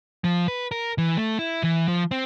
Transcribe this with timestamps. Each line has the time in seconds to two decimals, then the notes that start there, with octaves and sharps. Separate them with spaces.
0.24 F3
0.48 B4
0.71 A#4
0.98 E3
1.17 A3
1.39 E4
1.63 E3
1.88 F3
2.11 C4